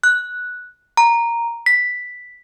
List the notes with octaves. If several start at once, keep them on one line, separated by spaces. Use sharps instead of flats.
F#6
A#5
B6